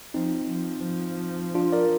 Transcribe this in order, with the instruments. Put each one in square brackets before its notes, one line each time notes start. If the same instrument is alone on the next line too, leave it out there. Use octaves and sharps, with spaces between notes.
[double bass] F3 [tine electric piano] C4 D#4
[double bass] F3
F3
[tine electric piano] D4 F4
A#4 D5